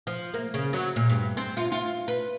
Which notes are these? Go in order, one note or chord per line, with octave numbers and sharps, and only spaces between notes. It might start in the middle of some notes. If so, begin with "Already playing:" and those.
F3
A#3
C#3
F#3
A#2
G2
C4
F4
F4
B4